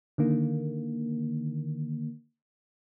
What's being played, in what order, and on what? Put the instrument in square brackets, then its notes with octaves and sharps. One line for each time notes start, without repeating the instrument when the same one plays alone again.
[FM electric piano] D3 D#3 A#3